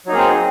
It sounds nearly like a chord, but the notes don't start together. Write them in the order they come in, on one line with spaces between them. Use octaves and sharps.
F#3 D#4 A#3 G#4 C4